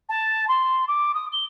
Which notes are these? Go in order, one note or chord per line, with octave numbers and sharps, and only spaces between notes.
A5
C6
D6
D#6
G7